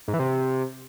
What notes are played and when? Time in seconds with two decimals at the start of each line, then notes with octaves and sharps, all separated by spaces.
0.08 G#2
0.14 E3
0.19 C3